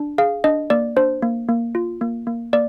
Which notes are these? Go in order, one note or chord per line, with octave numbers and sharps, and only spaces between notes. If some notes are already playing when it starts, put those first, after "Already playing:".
Already playing: D4
G#4 F5
D4 D#5
A#3 D5
D4 C5
A#3
A#3
F4
A#3
A#3
A#3 D5